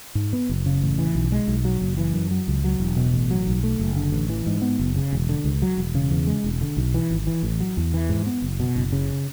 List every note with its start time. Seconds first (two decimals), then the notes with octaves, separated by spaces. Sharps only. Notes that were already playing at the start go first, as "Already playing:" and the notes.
0.15 G#2
0.33 B3
0.49 F#1
0.66 C#3
0.82 A1
0.99 E3
1.15 B1
1.32 G#3
1.48 B1
1.65 F#3
1.82 F#1
1.97 E3
2.14 F#2
2.31 F#3
2.48 C#2
2.64 F#3
2.80 E1
2.97 B2
3.14 A1
3.31 F#3
3.47 B1
3.63 A3
3.79 F#1
3.96 D3
4.12 A1
4.29 E3
4.46 G#2
4.62 B3
4.79 F#1
4.96 C#3
5.13 E1
5.29 D3
5.44 C#2
5.62 F#3
5.78 E1
5.95 C#3
6.11 E2
6.27 G#3
6.44 E1
6.61 D3
6.77 B1
6.94 E3
7.11 G#1
7.27 E3
7.43 A1
7.60 F#3
7.77 E2
7.94 E3
8.09 G#2
8.26 B3
8.42 F#1
8.60 B2
8.76 F#1
8.92 C#3